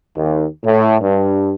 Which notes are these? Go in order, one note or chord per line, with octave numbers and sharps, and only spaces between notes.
D#2
A2
G2